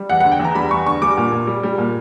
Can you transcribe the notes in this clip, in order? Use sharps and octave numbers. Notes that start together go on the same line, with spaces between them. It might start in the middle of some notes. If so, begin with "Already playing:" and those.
Already playing: G3
E2 F#5
F#5
D3
G5
E2 A#5
G3 B5
E2 C#6
D3 C#6
G3 D6
A#2
A#2
G3
G3
A#2